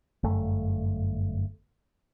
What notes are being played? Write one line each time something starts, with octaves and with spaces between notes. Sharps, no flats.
G1 F#2 A3